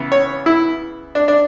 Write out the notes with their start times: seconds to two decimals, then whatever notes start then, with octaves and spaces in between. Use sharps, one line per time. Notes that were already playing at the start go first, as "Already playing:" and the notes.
Already playing: C#3 E3 B3
0.12 C#5
0.46 E4
1.15 D4
1.28 D4